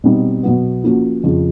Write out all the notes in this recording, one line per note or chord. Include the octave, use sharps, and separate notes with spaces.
B2 G3 C4 D#4
B2 F#3 B3
F3 A#3 C#4 F#4
F2 C#3 F3